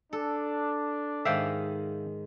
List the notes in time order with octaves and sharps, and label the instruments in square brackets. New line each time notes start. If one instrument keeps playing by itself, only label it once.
[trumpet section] D4 [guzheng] A4
[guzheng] G#2 D#3 [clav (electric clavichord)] E5 F5 G5